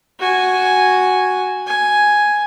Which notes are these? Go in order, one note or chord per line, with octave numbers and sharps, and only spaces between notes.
F#4 G#5
G#5